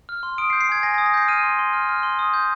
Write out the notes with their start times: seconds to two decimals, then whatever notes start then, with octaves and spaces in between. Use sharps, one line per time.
0.09 F6
0.23 C6
0.38 D#6 D7
0.50 C7
0.53 G6
0.61 C7
0.69 G#5 G#6
0.83 G#5 A#6
0.94 G#6
0.98 D#6
1.06 A#6
1.14 G6 C7
1.28 F6 D#7
1.43 C6
1.59 C6
1.73 F6
1.89 F6
2.03 C6
2.19 D#6
2.34 G6